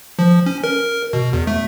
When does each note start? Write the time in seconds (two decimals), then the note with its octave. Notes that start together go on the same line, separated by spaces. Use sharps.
0.19 F3
0.46 C#4
0.64 A#4
1.13 B2
1.33 E2
1.47 A3